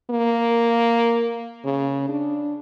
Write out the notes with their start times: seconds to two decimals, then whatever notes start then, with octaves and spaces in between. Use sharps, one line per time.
0.10 A#3
1.64 C#3
2.09 D4